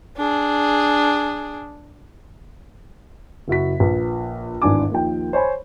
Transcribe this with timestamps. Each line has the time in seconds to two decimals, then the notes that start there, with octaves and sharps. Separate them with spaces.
0.17 D4 G#4
3.48 F#1 E4 F#4 B6
3.80 A#1 B4
4.62 G#1 E2 D4 G#5 D6
4.91 D#2 D#3 F3 G5
5.33 C5 C#5 G#5 B5